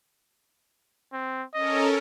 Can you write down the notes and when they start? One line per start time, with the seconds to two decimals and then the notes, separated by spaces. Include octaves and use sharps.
1.13 C4
1.54 C#4 A4 A#4 D#5